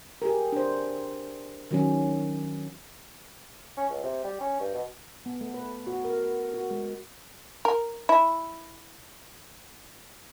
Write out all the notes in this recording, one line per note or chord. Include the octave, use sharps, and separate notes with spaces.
G4 G#4 A#4
D4 C5
D#3 F#3 C#4
C#4
C#2
C3
G3
C#4
G2
B2
B3
A3
B4
F#4
A#4
F#4
G#3
A#4
E4